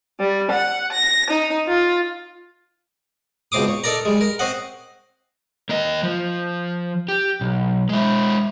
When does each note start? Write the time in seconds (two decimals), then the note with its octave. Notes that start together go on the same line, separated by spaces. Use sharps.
0.19 G3
0.50 F#5
0.91 A#6
1.31 D#4
1.67 F4
3.52 C#2 B2 C4 C5 D6 D#6
3.68 C#5
3.84 D#4 A4 A#4 D5 A#5
4.05 G3 G#3
4.21 A#4
4.39 C4 C5 C#5 D#5 F#5
5.69 A#3 D#5
6.03 F3
7.08 G4
7.41 B1
7.89 G#3 E4